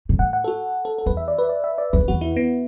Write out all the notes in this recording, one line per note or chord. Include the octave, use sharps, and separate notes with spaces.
B2
A2 F#5
F#5
A4
F#4
A4
A4
E2 B4
E5
D5
B4
D5
E5
D5
E2 B4
F#2
E2 F#4
E4
B3